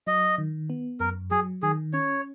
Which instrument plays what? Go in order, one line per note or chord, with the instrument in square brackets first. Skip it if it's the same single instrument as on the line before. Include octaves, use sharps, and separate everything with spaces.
[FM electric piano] F#3 [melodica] D#5
[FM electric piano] D#3
B3
[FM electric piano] F#2 [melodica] A#4
[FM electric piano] F#3 [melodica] G#4
[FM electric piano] D#3 [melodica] G#4
[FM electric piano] C#4 [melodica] C#5